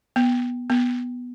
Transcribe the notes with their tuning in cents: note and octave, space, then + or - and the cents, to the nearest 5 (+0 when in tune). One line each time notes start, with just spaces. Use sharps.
B3 -10
B3 -5